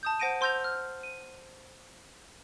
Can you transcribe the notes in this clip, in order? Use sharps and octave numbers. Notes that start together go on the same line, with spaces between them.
A5 D#6 G6
C5 F#5 A#6 D7 D#7
C5 C6 E6 G6 A#6 F7
F6
D#7